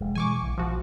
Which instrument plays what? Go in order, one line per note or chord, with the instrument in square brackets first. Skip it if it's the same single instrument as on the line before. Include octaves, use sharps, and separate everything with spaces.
[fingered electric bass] E1 G#3
[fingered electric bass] B2 E3 G#3 [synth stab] G#5 C#6 D6
[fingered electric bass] D1 A#1
[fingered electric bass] A#1 [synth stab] F3 F#4